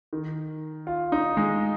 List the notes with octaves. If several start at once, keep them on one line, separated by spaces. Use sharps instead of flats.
D#3
F4
D#4
G#3